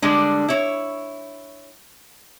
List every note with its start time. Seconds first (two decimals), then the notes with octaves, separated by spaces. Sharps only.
0.02 D3 G3 G#3 D4
0.48 E4 C#5